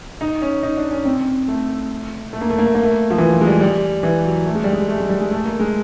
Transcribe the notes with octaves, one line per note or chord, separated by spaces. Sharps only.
D#4
C#4
D#4
D4
C#4
C4
A3
A3
A#3
A3
A#3
A3
A#3
A3
F3
E3
F3
G#3
G3
G3
E3
F#3
A3
G#3
G3
G#3
A3
G#3
G3
G#3
A3
A#3
G#3